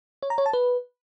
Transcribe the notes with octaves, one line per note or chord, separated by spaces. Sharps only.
C#5
A#5
C#5
A5
B4